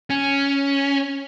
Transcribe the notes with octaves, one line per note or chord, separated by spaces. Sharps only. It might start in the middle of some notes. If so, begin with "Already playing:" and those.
C#4